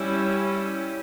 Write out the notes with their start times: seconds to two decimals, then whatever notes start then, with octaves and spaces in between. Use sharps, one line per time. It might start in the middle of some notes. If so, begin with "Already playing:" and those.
Already playing: G3 C#4 E4